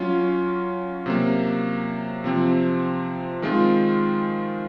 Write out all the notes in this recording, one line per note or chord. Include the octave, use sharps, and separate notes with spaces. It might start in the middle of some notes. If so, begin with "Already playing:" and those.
Already playing: F#3 C#4 F4
C3 F#3 A#3
C3 F3 C4
D#3 G#3 C4 F4